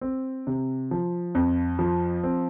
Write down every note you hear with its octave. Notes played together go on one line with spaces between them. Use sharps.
C4
C3
F3
F2
F3
C4